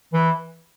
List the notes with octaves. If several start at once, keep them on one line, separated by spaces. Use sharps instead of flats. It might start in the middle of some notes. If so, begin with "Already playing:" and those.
E3